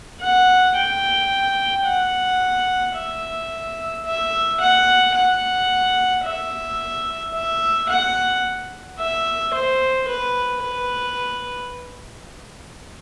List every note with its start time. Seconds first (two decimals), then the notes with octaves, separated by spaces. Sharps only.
0.21 F#5
0.75 G5
1.86 F#5
2.95 E5
4.05 E5
4.60 F#5
5.15 F#5
6.24 E5
7.34 E5
7.89 F#5
8.99 E5
9.54 C5
10.08 B4
10.63 B4